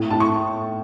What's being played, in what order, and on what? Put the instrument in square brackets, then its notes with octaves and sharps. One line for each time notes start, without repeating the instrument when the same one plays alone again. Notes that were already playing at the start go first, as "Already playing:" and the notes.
Already playing: [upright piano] A2
[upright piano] A2 [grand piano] A5
[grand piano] C#6